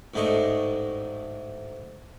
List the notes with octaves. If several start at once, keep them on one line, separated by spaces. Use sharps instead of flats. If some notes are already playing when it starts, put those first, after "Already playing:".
A1 G#2 A3 D4 D#5 C#6